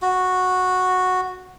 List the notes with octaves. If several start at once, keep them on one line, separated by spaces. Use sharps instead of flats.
F#4